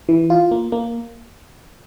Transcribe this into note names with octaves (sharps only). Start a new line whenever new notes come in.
E3
F4
A#3
A#3